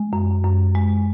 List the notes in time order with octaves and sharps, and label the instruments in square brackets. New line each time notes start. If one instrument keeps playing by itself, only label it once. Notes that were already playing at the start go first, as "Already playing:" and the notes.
Already playing: [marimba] G#3
F#2
F#2
G#3